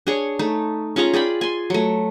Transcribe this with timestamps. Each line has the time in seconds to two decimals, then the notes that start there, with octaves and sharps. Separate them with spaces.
0.07 D4 G#4 C#5
0.39 A3 D#4
0.96 C#4 F4 G#4 A#5
1.14 G#4 D5 G5 B5
1.41 G#5 C6
1.70 F#3 A3